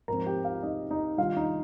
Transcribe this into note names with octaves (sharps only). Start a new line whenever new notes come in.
G#2 F3 C4 A#4 A#5
G4 G5
F4 F5
D#4 D#5
D#4 D#5
D#3 G3 D4 F4 F5
D#4 D#5